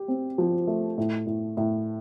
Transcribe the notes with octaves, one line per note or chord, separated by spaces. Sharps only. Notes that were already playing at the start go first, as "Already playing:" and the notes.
Already playing: G4
C4
F3
A3
A2
A2
A2